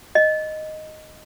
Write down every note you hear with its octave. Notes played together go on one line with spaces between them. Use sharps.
D#5